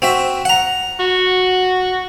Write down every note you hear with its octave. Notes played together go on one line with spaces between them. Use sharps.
C4 F#4 E5
F#5 A#5
F#4